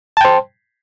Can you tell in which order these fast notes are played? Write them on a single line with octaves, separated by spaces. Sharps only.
A5 G5 C5